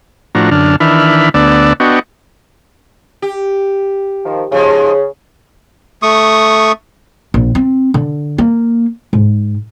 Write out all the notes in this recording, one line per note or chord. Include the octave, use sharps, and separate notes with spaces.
A2 F3 D4 F#4 A#5
F#2 D3 D4 F6
D#3 E3 D4 E5 B5 F6
D2 B3 D4 D5 E6
B3 D4 F#4 D#5 G5 C#6
G4
D#3 F3
G#2 C#3 F3 G#3
A3 C#6 D#6
A#1
C4
D3
A#3
G#2